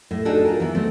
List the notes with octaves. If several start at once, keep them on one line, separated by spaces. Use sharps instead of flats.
A2
D4 D#4 F#4 G#4 A4
F4 A#4
E3 B3
A3 C4